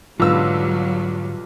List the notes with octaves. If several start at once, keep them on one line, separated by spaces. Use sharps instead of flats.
B1 G#2 D3 F#3 G3 F4 B4 E6